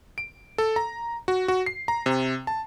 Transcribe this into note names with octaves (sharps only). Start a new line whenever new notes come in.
D7
A4
A#5
F#4
F#4
C7
A#5
C3
A5